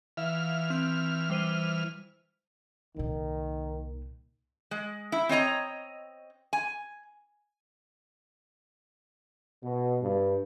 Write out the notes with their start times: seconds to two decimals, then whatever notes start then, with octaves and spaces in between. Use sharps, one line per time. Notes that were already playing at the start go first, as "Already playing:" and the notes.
0.17 E3 E5 F5 F6
0.70 C4 G6
1.30 G3 C5 D#7
2.96 C2 A#2 D#3
4.71 G#3
5.12 E4
5.29 C4 C#5 D#5 A#5
6.53 G#5
9.64 B2
10.02 G2